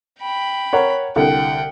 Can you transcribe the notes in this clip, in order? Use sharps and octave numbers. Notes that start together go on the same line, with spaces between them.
G5 B5
A#4 C#5 F#5
C2 D3 F#5 G5